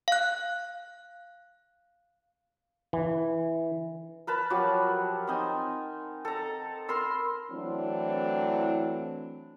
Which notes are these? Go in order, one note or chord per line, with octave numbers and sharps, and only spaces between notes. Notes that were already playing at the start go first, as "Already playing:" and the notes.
F5 F#6
E3
A#4 B4 A5 B5
F3 F#3 G4
C4 D#4 G#5
A4 A#5
A#4 B5 C6 E6
E3 F#3 A3 C4 D4 E4